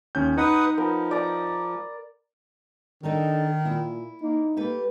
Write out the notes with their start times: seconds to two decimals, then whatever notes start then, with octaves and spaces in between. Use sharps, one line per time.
0.15 D#2 C#4 G6
0.38 D#4 B4 F#5 D#6
0.77 F3 B3 A#4
1.11 D5 A#5
3.03 D#3 D4 D#4 A4 A#4
3.65 A#2 E4
4.22 A#3 D#4
4.57 A3 A#3 G4 B4